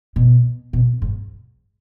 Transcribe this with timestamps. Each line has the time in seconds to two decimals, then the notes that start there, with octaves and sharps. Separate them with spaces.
0.16 B2
0.73 B2
1.02 G#2